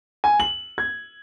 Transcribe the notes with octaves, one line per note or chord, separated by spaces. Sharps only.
G#5
F#7
G#6